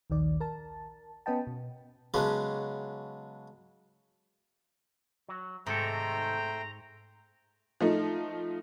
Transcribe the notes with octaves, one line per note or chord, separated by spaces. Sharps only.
A#1 D#2 D#3 D5
A#4 A5
B3 C#4 B4 D#5 G5 A5
B2
C#3 F#3 G#3 B3 C#4 D4
F#3
G#2 C3 D#3 A3 A4 C5 G5 A#5
F3 A3 D#4